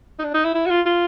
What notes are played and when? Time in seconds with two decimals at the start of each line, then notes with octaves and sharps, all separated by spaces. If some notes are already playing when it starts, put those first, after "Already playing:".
0.19 D#4
0.24 D4
0.34 D#4
0.44 E4
0.55 E4
0.66 F#4
0.70 F4
0.86 F4